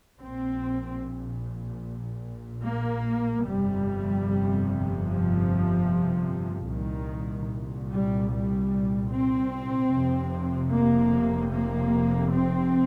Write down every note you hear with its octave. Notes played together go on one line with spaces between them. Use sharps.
A#1 A#2 C4
A#3
G1 F2 C3 G3
F3
C2 A#2 D#3
G3
G3
C4
F1 F2 C3
A#3
A#3
C4